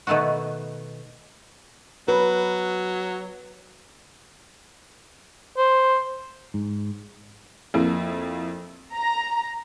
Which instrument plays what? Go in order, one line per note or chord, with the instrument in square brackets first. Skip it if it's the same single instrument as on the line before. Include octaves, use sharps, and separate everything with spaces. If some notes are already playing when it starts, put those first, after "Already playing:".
[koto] B2 D#3 A3 B3 F#4
[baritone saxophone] F#3 [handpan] B4
[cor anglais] C5
[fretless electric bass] G#2
[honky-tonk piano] F2 A#3 E4
[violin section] A#5